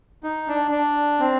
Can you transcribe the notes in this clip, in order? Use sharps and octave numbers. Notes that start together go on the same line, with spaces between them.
D#4
D4
D4
C4